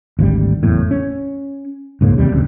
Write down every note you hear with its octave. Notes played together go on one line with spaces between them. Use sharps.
G#1 D2 E3 G3
F#1 E2 A2
C#4
C#2 G#2 C#3 A#3
D#2 C3 G3
D#1 D2 C#3